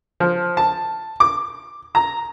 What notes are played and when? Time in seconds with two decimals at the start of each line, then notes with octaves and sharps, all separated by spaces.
0.20 F3
0.57 A5
1.20 D6
1.95 A#5